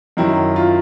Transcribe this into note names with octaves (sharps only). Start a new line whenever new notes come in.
F#2 D#3 F#3 E4
F4